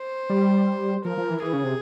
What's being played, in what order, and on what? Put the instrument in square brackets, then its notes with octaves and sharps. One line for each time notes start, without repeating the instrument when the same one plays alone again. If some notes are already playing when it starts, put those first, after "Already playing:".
Already playing: [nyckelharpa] C5
[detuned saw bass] G3
[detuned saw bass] F3 [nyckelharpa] A#4
[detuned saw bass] F3
E3
[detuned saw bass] E3 [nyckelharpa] G#4
[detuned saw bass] C#3
C3